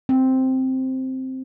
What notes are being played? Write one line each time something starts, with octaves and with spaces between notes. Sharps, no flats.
C4